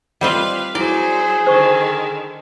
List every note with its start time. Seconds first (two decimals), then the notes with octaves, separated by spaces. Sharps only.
0.21 G3 C4 F4 B4 D#5 F5
0.75 F#3 E4 G#4 C5 D5
1.47 D3 D#3 C5 C#6